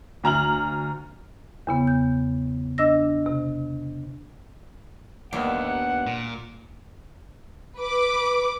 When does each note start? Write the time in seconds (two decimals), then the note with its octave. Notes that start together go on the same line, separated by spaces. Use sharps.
0.24 D2 A#5 F6 F#7
1.67 E2 C#3 B3
1.87 G6
2.78 D4 D#5 E6 A#6
3.26 C3
5.33 D#2 B3 D4 G4 F#5
6.06 A#2
7.77 B4 D6